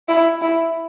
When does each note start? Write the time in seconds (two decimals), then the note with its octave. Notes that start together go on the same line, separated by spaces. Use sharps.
0.09 E4
0.42 E4